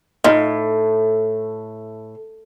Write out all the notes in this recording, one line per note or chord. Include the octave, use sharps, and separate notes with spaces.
A2 D#4 F4 F5